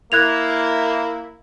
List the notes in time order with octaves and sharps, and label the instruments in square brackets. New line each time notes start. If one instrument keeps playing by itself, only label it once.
[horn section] A#3 E4 [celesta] F#6 G#6 F7